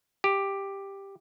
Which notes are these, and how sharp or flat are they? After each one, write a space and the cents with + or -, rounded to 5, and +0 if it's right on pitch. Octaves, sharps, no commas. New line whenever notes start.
G4 +5